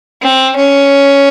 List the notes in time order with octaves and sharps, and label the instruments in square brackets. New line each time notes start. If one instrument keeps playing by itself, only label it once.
[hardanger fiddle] C4
C#4